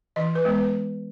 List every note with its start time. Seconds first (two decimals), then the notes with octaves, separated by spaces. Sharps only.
0.16 E3 D#5
0.35 B4
0.45 G#3 B3
0.54 B4